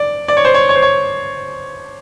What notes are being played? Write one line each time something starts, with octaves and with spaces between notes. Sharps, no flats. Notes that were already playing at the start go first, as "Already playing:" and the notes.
Already playing: D5
D5
C#5
C5
C#5
C#5
C5
C#5